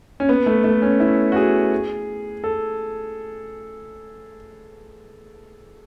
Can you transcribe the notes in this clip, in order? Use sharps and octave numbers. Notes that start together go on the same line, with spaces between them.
C#4
B3
A3
A3
C#4
E4
F#4
G#4
A4